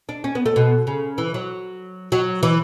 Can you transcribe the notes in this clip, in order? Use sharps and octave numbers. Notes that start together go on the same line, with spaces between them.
D4
C#4
B3
A3
B2
C#3
E3
F#3
F#3
E3